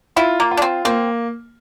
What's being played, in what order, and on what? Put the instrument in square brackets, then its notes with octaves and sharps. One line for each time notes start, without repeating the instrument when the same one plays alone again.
[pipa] E4 [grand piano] F4
[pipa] A#3
[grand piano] F4
[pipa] D4
C4
[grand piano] A#3 [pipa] C4